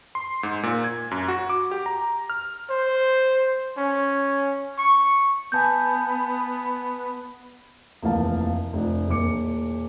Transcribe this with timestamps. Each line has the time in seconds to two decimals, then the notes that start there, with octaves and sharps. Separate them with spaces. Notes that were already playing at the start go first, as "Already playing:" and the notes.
0.15 C6
0.43 G#2
0.63 A#2
0.84 G#6
1.11 F#2
1.28 F#4
1.50 D6
1.71 G4
1.86 A#5
2.30 F6
2.70 C5
3.77 C#4
4.78 C#6
5.52 B3 G#5 A5 G6
8.02 F1 D#2 E3 A#3 F5 A5
8.73 F1 F3 D4
9.08 E1 A#2 A#3 D6 C#7